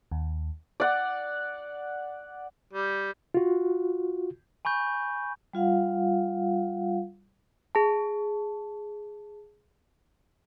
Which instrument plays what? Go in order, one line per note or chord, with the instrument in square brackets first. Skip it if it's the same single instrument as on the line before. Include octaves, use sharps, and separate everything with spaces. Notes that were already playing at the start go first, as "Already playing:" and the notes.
[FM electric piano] D#2
[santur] D5 F#5
[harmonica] G3
[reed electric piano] F4 F#4
[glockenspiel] G#5 B5 C#6 G6
[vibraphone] G3 F4 F5 F#5
[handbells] G#4 A5